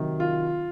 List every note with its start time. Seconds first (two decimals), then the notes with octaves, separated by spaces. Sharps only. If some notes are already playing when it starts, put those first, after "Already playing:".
Already playing: C3 D#3 F#3
0.20 F4